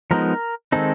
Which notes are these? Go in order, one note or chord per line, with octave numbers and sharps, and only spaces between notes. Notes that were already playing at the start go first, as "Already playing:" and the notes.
F3 G#3 B3 D#4 A#4
D#3 G#3 C4 D#4 A4